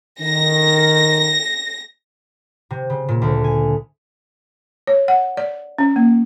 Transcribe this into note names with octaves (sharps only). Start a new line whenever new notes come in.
D#3 A#6
C3
C#3
A#2
D2
G#5
C#5
F#5
D5
C#4
A#3